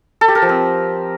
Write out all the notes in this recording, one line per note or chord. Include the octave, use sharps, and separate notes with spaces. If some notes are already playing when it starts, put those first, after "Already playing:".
A4
G4
A#4
F3
C4